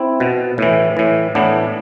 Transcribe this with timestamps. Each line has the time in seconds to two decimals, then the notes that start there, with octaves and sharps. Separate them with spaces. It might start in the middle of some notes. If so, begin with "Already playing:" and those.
Already playing: C4 E4
0.20 B2
0.58 A2 E3
0.97 A2 E3
1.35 A2 E3 B3 D4